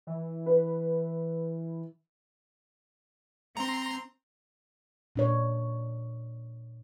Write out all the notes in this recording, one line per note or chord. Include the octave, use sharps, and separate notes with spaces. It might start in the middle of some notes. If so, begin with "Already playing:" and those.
E3
B4
C4 A#5 C6
A#2 D4 C#5